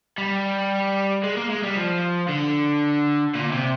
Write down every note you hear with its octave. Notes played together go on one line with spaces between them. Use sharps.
G3
G#3
A#3
G#3
G3
F3
D3
A#2
C3